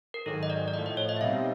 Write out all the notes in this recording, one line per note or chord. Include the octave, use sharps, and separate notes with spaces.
A#4
G#2 D#3 F#3 A4
D#5
D5
D5
A2 F3 A3 D#5
D#5
C#5
D#5
E5
B2 G3 C4 D#4 F5